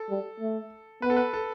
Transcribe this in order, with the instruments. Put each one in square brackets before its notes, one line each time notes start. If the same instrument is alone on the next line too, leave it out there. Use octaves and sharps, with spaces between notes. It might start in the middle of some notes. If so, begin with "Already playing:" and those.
Already playing: [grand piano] A4
[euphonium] G3
A3
[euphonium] B3 [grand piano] B4
[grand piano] A4
B4
A4